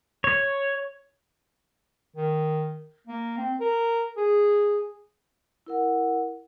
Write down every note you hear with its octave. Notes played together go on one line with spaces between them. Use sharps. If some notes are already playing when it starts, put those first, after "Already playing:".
C#5
D#3
A#3
C4
A#4
G#4
E4 A#4 F#5